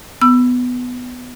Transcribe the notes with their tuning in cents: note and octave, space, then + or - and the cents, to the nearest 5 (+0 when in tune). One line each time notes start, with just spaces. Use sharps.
B3 +10 E6 +20